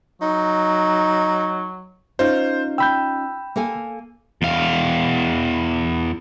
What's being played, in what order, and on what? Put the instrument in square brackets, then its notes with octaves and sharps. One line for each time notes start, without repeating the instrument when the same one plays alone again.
[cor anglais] F#3 [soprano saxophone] D#4
[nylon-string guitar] C#4 D#4 F4 [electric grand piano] C5
[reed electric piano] G5 B5 G6 [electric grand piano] E6
[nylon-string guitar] A#3 A4 G#5
[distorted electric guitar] E2 F5